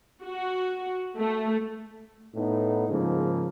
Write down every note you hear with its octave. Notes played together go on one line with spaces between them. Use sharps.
F#4
A3
A2 B3 D#4
G#2 C#3 F3 A#3